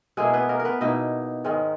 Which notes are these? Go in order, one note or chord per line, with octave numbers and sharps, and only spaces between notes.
B2 G#3 A#3 E4 G#4
B3 B4
A#3 A#4
A#4
B3 B4
B2 A#3 D#4 E4 D#5
G#2 D#3 G#3 C#4